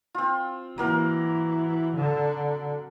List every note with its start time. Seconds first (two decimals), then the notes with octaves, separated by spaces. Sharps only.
0.15 C4 F4
0.78 E3 F#3 A#3 A#4
1.96 D3